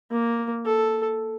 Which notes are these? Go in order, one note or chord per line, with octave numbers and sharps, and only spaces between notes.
A#3
A4